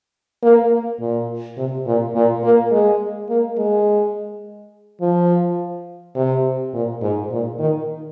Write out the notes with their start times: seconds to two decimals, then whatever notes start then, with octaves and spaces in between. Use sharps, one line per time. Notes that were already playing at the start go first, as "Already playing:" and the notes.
0.43 A#3
1.00 A#2
1.57 C3
1.86 A#2
2.15 A#2
2.44 A#3
2.72 G#3
3.29 A#3
3.58 G#3
5.01 F3
6.16 C3
6.74 A#2
7.01 G#2
7.31 A#2
7.59 D#3